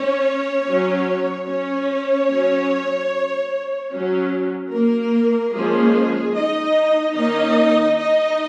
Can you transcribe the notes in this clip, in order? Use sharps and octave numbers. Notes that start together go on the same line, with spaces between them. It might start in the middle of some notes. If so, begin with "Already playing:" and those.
Already playing: C#4 C#5
F#3 C#4
C#4 C#5
F#3 C#4
F#3 C#4
A#3 A#4
F3 G#3 A#3 C#4 G#4
D#4 D#5
D#3 A#3 C#4 D#4 D#5
D#4 D#5